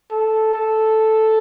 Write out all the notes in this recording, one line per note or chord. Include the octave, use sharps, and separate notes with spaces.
A4
A4